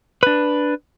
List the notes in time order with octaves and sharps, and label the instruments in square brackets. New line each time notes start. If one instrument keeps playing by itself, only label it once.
[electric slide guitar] D4 B4